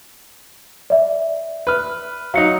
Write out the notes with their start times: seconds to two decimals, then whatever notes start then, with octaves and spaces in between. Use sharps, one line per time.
0.90 D5 E5
1.67 B4 F6
2.34 F#3 D#4 F5 C#7